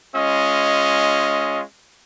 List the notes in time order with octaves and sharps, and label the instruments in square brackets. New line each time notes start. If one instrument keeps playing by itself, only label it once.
[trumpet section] G#3 C#4 F4 D#5